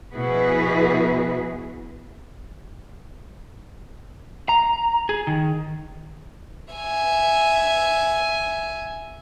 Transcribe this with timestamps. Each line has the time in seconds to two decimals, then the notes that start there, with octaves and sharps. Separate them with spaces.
0.13 B2 F3 E4 F#4 G#4 B4
4.49 A#5
5.09 G#4
5.27 D#3
6.74 E5 G#5